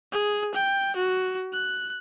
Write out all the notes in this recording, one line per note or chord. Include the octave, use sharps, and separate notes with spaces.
G#4
G5
F#4
F#6